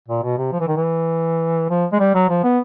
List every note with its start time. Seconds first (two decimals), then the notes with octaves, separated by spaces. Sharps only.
0.08 A#2
0.23 B2
0.38 C3
0.52 F3
0.60 E3
0.68 D#3
0.76 E3
1.70 F3
1.92 G#3
1.99 G3
2.14 F#3
2.29 F3
2.44 B3